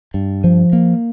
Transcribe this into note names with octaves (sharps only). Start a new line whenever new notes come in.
G2
F3
A#3